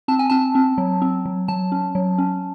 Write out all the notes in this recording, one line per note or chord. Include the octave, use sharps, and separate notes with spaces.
C4 A5
G#5
C4 A5
C4
F#3
C4
F#3
F#3 A5
C#4
F#3
C#4